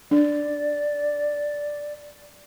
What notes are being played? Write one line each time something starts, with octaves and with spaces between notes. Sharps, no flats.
D4 D5